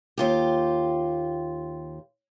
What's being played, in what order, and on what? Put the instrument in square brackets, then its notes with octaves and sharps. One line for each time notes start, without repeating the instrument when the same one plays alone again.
[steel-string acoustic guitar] D#2 F4 G4